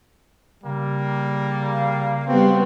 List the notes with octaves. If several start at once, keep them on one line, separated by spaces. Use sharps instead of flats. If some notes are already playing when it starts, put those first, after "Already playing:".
C#3 G3 A#3
F5
G3 B3 C4 F#4